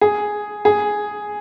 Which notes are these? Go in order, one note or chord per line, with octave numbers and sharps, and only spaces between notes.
G#4
G#4